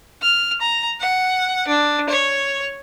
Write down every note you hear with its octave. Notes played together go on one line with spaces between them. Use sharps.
F6
A#5
F#5
D4
C#5